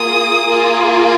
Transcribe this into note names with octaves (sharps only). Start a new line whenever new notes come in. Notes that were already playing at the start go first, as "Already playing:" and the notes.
Already playing: A#3 F4 G#4 D#6
A#3 F4 G#4